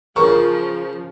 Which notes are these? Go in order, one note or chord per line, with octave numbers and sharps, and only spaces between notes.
C#3 F3 A#4 C#6